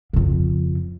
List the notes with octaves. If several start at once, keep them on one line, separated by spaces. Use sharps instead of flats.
F2 C#3